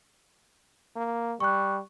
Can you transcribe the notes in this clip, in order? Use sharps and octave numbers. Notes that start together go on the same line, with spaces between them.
A#3
G3 C#6 F#6